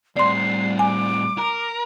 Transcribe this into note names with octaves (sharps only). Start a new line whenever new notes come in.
A2 G3 C4 D5 C6 C7
G#5 D6
A#4